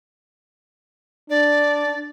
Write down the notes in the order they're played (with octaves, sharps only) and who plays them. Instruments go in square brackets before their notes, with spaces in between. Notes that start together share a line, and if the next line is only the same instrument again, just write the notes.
[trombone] D4 [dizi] D5